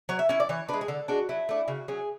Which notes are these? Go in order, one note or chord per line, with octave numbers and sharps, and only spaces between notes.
F#3 C#5
E5
C#4 E4 E5
D5
E3 C#5
G#3 D4 B4
G#4
D3 A4
G#3 D4 F#4
F#3 E4
A3 D4
C#3 F#4
F#3 C#4 G#4